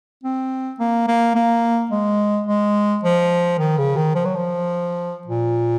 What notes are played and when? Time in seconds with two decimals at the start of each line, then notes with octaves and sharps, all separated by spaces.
0.24 C4
0.79 A#3
1.08 A#3
1.35 A#3
1.91 G#3
2.47 G#3
3.04 F3
3.59 D#3
3.78 C#3
3.97 D#3
4.15 F3
4.25 F#3
4.36 F3
5.27 A#2